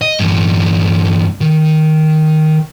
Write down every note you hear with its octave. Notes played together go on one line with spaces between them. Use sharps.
D#5
E2 G2
D#3